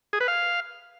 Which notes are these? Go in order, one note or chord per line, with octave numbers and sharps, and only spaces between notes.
G#4
B4
F5